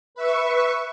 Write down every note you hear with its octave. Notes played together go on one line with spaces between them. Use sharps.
B4 E5 C#6